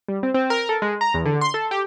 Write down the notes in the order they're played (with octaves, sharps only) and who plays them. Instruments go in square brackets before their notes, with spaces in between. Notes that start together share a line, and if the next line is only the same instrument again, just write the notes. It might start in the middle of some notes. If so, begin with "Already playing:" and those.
[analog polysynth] G3
C4
C4
A#4
A4
G#3
A#5
E2
D3
C6
A4
G4